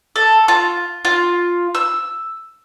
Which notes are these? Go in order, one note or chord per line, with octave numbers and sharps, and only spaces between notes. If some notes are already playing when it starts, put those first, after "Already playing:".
A4
F4
F4
E6